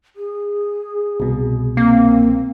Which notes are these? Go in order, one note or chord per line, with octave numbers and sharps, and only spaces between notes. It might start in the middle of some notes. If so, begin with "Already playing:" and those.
G#4
C2 B2
A#3 C4